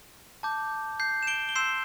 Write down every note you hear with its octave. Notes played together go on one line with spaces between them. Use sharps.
A5 D6 G6
G6 C7
E7
D7 G7
G7
C6 E6 G6 C7 E7